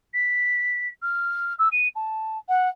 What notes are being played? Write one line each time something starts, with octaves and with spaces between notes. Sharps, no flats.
B6
F6
E6
D#7
A5
F#5